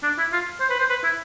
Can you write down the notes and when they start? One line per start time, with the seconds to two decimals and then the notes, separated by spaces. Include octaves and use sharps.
0.03 D4
0.18 E4
0.33 F4
0.60 C5
0.70 B4
0.79 C5
0.89 B4
1.04 E4